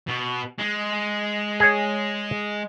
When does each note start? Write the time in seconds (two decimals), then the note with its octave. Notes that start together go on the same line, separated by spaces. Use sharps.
0.07 B2
0.58 G#3
1.60 G#4 C#5